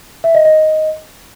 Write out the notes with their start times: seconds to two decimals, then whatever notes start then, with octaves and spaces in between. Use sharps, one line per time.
0.24 E5
0.35 D#5
0.45 D#5